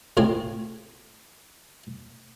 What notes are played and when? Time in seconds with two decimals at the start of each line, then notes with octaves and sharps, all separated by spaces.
0.17 C#2 A2 C4 G#5